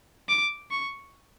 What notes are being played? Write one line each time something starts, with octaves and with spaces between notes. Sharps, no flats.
D6
C#6